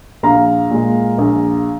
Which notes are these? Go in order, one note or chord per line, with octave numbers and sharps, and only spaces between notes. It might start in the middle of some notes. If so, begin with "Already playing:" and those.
A#1 F5 A#5
A#2 G#3
A#1